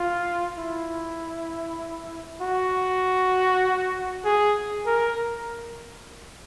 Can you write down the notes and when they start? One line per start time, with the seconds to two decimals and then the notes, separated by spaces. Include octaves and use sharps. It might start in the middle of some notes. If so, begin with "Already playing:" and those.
Already playing: F4
0.59 E4
2.41 F#4
4.25 G#4
4.86 A#4